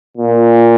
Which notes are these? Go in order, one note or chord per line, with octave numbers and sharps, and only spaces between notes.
A#2